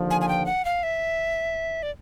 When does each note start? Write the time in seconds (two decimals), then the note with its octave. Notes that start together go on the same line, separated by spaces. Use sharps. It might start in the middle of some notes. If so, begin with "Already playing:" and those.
Already playing: D#2 D3 F3
0.10 G#5
0.21 G#5
0.29 G5
0.46 F#5
0.65 F5
0.83 E5
1.83 D5